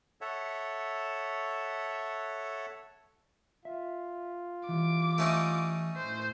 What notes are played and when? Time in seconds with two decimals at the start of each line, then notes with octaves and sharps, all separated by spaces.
0.21 A4 C#5 E5 F#5
3.65 F4 E5
4.69 E3 G3 D6
5.18 A3 C#4 D#4
5.97 A2 C5